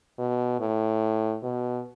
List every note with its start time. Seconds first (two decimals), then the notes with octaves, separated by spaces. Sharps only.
0.18 B2
0.60 A2
1.43 B2